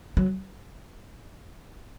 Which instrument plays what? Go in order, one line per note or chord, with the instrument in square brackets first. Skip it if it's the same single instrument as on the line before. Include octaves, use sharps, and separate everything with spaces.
[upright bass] F#3